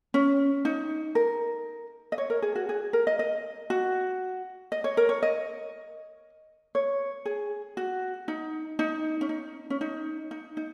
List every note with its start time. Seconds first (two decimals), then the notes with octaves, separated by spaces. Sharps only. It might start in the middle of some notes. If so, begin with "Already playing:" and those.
0.14 C#4
0.65 D#4
1.15 A#4
2.12 D#5
2.18 C#5
2.30 A#4
2.42 G#4
2.55 F#4
2.69 G#4
2.93 A#4
3.07 D#5
3.19 D#5
3.70 F#4
4.72 D#5
4.84 C#5
4.97 A#4
5.09 C#5
5.22 D#5
6.75 C#5
7.25 G#4
7.77 F#4
8.28 D#4
8.79 D#4
9.21 C#4
9.29 D#4
9.70 C#4
9.81 D#4
10.31 D#4
10.57 D#4